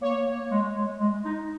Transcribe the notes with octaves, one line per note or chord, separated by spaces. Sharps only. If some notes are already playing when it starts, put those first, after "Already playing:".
A#3 C#5
A#3
G#3
G#3
G#3
D#4